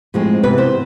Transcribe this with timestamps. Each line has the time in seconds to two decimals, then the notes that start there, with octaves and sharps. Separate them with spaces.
0.14 A2 F3 G#3 C4
0.43 C3 E3 B3 B4
0.58 C5